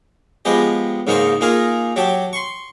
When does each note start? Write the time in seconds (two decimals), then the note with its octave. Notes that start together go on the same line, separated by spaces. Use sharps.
0.45 F3 G#3 B3 G4 D#5
1.07 G#2 C#3 A#3 D#4 C5 C#6
1.41 A#3 D#4 F4 G#4 A#4
1.96 F#3 G4 G5 A5
2.33 C6 C#6